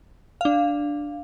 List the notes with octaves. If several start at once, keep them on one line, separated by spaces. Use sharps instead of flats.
D4 F5